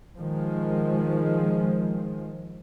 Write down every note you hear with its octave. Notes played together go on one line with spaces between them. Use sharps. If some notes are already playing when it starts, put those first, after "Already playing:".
D#3 F3 G#3